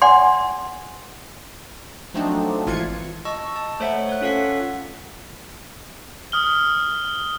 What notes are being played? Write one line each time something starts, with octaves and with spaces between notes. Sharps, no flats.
D5 F#5 G#5 C6
F3 F#3 A3 C4 D4 D#4
G#1 E3 F4 G#6 C#7
D#5 A5 C#6 E6
A5
A3 C5 C#5 E5 F#5
C#5 F#6
C#4 F4 A4 F5 F#5 B6
D#6 F6 G7